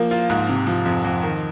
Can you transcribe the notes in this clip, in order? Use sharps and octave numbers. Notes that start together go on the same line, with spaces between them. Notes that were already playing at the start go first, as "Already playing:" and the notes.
Already playing: F3 A#3
F4
G#2
C3
F3
F2
F2
D#3